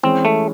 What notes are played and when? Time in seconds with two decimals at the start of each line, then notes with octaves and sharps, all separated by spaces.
0.03 E3 G#3 C4 C#4
0.25 A3